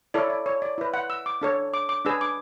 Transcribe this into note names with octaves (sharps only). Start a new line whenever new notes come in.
E4 A4 C#5 D5
D5
C#5
D5
E4 B4
F#5
E6
D6
D4 A4 C#5
D6
D6
D4 G#4 B4 E6
D6